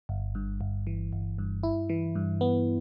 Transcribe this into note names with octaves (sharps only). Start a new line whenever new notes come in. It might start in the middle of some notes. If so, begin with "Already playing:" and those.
G1
G2
G1
E3
G1
G2
E4
E3
G2
B3